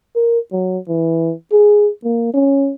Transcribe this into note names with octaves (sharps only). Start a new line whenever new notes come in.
A#4
F#3
E3
G#4
A#3
C#4